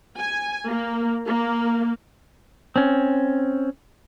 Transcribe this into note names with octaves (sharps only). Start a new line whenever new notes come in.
G#5
A#3
A#3
C4 C#4